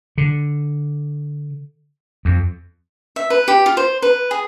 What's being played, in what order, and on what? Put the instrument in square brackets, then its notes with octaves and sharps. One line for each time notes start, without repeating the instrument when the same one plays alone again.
[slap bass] D3
F2
[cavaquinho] E5
B4
G4
F4
C5
B4
G#4